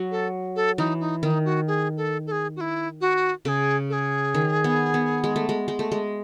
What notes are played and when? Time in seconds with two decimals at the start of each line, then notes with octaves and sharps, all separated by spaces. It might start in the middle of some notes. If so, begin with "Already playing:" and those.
Already playing: F#3
0.11 A4
0.56 A4
0.78 E3 D#4
1.00 D#4
1.23 D#3 D#4
1.45 F#4
1.67 G#4
1.97 A4
2.27 A4
2.32 G#4
2.56 F#4
2.61 E4
3.01 F#4
3.45 C#3 A4
3.48 G#4
3.90 A4
3.93 G#4
4.34 D#3
4.64 B3
4.94 B3
5.24 G#3
5.36 A3
5.49 G#3
5.68 G#3
5.79 A3
5.92 G#3